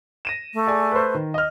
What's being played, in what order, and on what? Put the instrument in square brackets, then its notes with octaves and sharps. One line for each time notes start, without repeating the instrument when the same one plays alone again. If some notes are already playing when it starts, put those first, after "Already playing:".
[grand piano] A#6 D#7 E7
[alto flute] A3
[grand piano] G#4 D5 G#5
B4 C5
D#3
D#5 F6